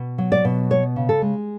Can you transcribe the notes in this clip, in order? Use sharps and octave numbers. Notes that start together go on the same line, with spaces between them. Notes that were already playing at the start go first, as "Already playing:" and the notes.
Already playing: B2
F#3
D5
B2
B3 C#5
C#3
A4
G#3